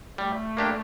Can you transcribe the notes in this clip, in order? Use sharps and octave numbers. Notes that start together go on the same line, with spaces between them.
G3 A3
A#3 D4 G4